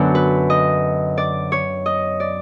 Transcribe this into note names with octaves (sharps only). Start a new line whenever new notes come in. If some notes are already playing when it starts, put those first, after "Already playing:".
Already playing: F#2 D3 F#3 B3 D4
B4
D#5
D5
C#5
D#5
D5